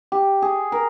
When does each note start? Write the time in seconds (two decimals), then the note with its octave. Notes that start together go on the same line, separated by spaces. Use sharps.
0.12 G4
0.42 G#4
0.72 A#4